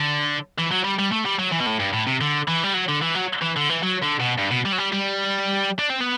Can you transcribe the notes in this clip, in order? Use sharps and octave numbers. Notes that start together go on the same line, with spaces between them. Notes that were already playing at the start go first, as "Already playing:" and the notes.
Already playing: D3
E3
F#3
G3
G3
A3
G3
F#3
E3
B2
A2
G2
A2
C3
D3
E3
G3
F#3
D3
E3
F#3
E3
D3
E3
F#3
D3
B2
G2
B2
G3
F#3
G3
G3
D4
C4
B3